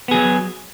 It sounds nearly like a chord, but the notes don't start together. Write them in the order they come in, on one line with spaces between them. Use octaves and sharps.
B3 G#4 F#3